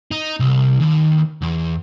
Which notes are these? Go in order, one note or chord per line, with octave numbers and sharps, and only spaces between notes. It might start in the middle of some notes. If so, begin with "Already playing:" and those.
D#4
C2
D#2
E2